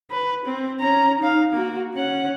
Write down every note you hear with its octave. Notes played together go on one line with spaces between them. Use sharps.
B4
C4
C#4 A#5
D#4 F5
A#3 F#4
C#4 F#5